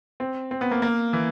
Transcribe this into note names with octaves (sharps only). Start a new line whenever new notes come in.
C4
C4
B3
A#3
A#3
E3